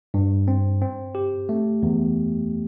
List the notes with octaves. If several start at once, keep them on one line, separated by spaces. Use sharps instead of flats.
G2
C4
C4
G4
A3
E2